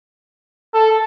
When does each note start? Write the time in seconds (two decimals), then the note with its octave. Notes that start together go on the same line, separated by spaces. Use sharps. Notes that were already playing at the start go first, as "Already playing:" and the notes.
0.74 A4